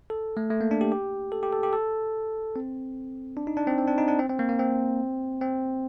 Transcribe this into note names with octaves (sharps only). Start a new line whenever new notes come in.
A4
A3
A3
A#3
D4
G4
G4
A4
G4
A4
G4
A4
C4
D4
D#4
D4
C4
C4
D4
D#4
D4
C4
C4
A#3
A#3
C4
C4